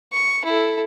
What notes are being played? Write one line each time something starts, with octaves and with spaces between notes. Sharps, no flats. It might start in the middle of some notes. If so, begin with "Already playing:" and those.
C#6
E4 A4